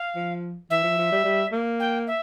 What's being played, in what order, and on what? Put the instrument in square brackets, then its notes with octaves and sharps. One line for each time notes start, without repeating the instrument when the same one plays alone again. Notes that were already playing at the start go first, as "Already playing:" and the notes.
Already playing: [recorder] F5
[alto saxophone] F3
[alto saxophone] E3 [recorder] E5
[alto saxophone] F3
F3
G3
G3
A#3
[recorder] G5
E5